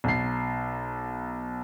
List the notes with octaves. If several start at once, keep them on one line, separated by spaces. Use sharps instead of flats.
B1 C7